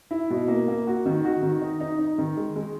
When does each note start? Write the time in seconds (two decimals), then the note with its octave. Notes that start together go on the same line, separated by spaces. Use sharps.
0.11 E4
0.30 B2
0.48 A#3
0.68 A#3
0.87 F#4
1.06 D#3
1.25 F#4
1.42 D#3
1.62 D#4
1.80 D#4
1.99 D#4
2.18 D#3
2.37 G#3
2.56 G#3